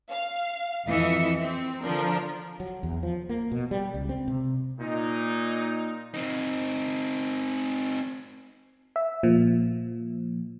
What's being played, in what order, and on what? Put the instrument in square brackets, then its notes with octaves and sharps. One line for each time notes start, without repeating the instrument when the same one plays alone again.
[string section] F5
F2 E3 D#5 E5 C#7
C4
D3 F3 D4 A#4
[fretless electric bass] F#3
E2
F3
A#3
B2
G3
C#2
C4
C3
[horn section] A#2 D#4
[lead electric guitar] C4 D#4
[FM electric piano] E5
A#2 F3